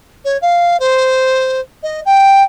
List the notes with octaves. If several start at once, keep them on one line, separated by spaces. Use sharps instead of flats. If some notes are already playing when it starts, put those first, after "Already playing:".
C#5
F5
C5
D#5
G5